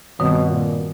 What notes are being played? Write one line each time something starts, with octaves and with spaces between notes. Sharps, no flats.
G2 B2 D#3 G3 C4
A#2